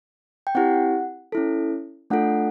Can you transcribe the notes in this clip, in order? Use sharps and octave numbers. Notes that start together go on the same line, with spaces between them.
G5
C4 E4 G4 F#5
C#4 E4 A4
A3 D4 F4 A4 F#5